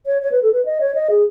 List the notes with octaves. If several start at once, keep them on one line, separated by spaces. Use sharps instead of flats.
C#5
C#5
B4
A4
B4
D#5
C#5
D#5
G#4